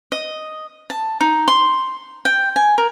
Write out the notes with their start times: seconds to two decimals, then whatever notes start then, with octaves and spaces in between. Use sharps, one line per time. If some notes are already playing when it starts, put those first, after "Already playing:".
0.12 D#5
0.90 A5
1.21 D#4
1.48 C6
2.25 G5
2.56 G#5
2.78 A#4